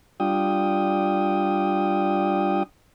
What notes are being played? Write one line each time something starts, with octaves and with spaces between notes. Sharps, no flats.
G3 D4 F4 G5 D#6